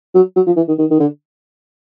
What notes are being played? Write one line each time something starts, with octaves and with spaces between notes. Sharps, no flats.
F#3
F#3
F3
E3
D#3
D#3
D#3
D3